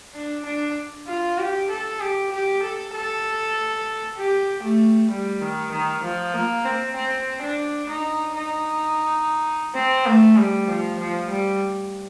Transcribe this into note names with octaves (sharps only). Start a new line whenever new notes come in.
D4
D4
F4
G4
A4
G4
G4
A4
A4
G4
A3
G3
D#3
D#3
F3
A#3
C4
C4
D4
D#4
D#4
C4
A3
G3
F3
F3
G3